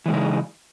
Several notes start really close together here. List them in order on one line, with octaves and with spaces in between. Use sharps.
E3 G#3 C#3 D#4